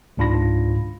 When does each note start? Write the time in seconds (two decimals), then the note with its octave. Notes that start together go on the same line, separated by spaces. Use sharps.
0.17 C#2 G#2 D4 F4 B5 A#6